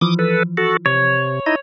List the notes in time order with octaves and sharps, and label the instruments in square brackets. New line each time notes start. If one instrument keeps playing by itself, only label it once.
[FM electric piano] E3 F3 [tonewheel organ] D6 D#6
[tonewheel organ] A4 B4
F#4 A4
[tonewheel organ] C3 [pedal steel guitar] C#5
[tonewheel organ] D#4 E4 D#5